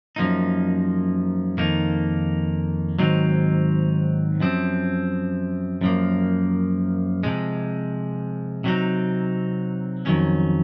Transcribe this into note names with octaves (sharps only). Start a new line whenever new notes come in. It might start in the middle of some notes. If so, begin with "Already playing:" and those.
F#2 F3 A#3 D#4
F2 D#3 A#3 D#4
G#2 D#3 F#3 C4 D#4
F#2 F3 C4
F#2 F3 A#3
C3 F3 G#3
C3 F#3 C4 D#4
F2 D#3 F#3 C#4